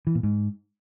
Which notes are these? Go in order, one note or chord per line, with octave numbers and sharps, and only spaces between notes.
E3
A#2
G#2